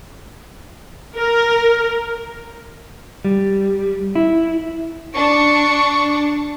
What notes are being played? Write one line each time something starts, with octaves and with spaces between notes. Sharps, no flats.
A#4
G3
E4
D4 C#6